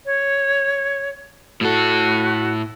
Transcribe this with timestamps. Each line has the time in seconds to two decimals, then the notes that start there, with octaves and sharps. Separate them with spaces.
0.06 C#5
1.61 A2 F#4 A4